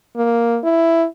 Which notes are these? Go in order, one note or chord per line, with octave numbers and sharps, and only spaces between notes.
A#3
E4